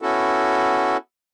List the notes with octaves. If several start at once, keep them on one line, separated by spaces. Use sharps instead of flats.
B3 C#4 E4 F#4 A4